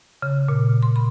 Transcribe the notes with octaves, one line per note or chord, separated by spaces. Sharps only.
C#3
A#2
C6
B5